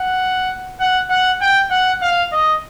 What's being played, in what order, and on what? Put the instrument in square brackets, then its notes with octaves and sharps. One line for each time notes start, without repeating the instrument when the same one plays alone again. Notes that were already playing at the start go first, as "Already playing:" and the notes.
Already playing: [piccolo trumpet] F#5
F#5
F#5
G5
F#5
F5
D#5